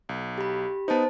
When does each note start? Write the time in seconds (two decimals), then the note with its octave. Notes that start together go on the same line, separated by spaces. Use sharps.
0.09 B1
0.38 G4 B5
0.88 B3 D#4 C5 A5